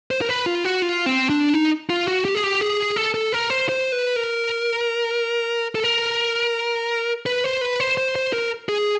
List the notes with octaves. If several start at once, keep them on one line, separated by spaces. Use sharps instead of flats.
C5
A#4
B4
F4
F#4
F4
C4
D4
D#4
F4
F#4
G4
G#4
G4
G#4
A4
A4
A#4
C5
C5
B4
A#4
A4
A#4
B4
C5
B4
C5
C5
C5
A#4
G#4